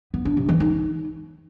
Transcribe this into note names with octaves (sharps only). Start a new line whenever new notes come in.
B3
D4
C3
E3
D#4